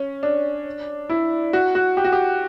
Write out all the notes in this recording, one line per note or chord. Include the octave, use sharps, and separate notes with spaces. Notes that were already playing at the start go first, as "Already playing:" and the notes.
Already playing: C#4
D4
E4
F#4
F#4
G4
F#4
G4